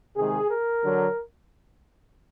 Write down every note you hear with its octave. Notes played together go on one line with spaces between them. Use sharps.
C3 D#3 G#3 G#4
A#4
D3 F#3